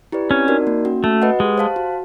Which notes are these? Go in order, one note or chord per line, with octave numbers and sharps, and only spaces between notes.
E4 G4 B4 D5
C4 C#4
D#4 F#4 A#4 D5
A#3
C#4 F#4
A3 F#4
B4 D#5 F#5
G#3 G4
C5 F5 A5
F#4